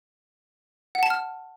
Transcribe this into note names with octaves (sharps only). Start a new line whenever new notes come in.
F#5
A5
F6